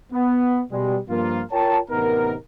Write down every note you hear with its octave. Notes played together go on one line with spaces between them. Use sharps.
B3
B2 G3 G#3
G2 F3 A#3 F4
F4 A#4 C#5 G5 A5
A1 C3 B3 D#4 A#4